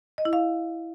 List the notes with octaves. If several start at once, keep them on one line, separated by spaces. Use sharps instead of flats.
D#5
E4
F5